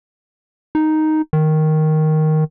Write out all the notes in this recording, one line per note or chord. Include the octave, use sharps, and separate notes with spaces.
D#4
D#3